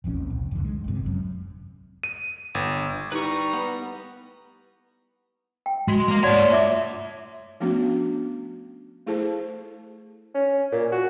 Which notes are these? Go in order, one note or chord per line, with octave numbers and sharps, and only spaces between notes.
E1 A#1 F2 C#4
C2
F2 D3
G#3
G1 C3
F#2
D#7
G1
G3 D#4 E4 G4 B4 A#5 C#6
B3
G5
G#3 F#4 C6
A#4 F5
C#5 D5 F#5 A5 C6
F4 E5 D6
F3 A3 B3 C#4 D4 F#4
A3 E4 G#4 A4 C5 A5
C#4
A#2
F#4